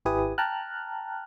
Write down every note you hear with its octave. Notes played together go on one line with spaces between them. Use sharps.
G#1 E4 G4 B4 G#5 D#6
G5 A5 A#5 F6 F#6